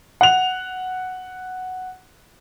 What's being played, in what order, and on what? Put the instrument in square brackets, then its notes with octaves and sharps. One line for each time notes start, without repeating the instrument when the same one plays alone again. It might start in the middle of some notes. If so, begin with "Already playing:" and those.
[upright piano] F#5 F7